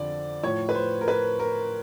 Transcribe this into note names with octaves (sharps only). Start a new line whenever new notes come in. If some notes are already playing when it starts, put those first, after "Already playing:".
Already playing: F2 D3 F3 D5
A2 F3 C#5
B4
C5
A#4
B4
A#4